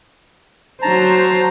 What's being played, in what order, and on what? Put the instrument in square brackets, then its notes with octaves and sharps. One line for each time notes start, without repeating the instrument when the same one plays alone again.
[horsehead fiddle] F#3 C5 [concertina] A5 A#5